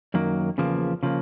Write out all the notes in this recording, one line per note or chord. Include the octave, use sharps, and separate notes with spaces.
F#2 D#3 F#3 A#3
E2 C#3 F3 A#3
C#3 F3 A#3